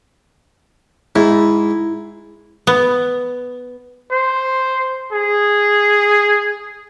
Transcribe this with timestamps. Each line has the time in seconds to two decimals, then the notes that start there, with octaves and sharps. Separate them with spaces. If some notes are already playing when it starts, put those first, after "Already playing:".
1.16 G#2 E4
2.67 B3
4.11 C5
5.12 G#4